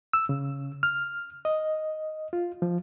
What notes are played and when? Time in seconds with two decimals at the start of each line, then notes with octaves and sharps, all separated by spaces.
0.13 E6
0.29 C#3
0.83 F6
1.45 D#5
2.33 F4
2.62 F3